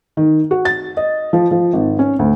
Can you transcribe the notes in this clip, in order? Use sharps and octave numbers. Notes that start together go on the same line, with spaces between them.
D#3
F#4
A6
D#5
F3
F3
G#1
C#4
D2